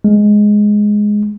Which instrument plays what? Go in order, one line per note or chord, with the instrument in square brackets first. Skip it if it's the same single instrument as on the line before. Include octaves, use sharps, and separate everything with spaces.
[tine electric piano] G#3